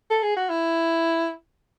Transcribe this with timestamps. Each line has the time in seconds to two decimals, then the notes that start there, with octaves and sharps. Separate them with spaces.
0.10 A4
0.23 G#4
0.37 F#4
0.50 E4